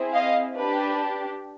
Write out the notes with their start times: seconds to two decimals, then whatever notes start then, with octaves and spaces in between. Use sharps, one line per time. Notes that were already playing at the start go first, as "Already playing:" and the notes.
Already playing: C4 E4 G#4
0.14 D#5 F5
0.56 D4 G4 B4